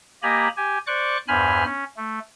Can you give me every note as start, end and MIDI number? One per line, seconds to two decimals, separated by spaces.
0.23 0.48 58
0.23 0.48 67
0.23 0.48 75
0.23 0.48 80
0.23 0.48 82
0.23 0.48 83
0.57 0.78 67
0.57 0.78 80
0.87 1.17 72
0.87 1.17 74
0.87 1.17 85
0.87 1.17 86
0.87 1.17 90
1.28 1.64 40
1.28 1.64 43
1.28 1.64 72
1.28 1.64 80
1.28 1.64 83
1.28 1.64 89
1.65 1.85 61
1.97 2.19 57